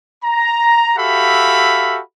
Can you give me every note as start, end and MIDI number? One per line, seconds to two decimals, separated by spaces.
0.24 0.92 82
0.98 2.00 66
0.98 2.00 67
0.98 2.00 69
0.98 2.00 76
0.98 2.00 77
0.98 2.00 83